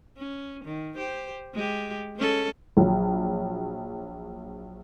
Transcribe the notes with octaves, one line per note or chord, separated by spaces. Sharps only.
C#4
D#3
G4 C5
G#3 G4
G#3 C#4 A4
A#1 F#3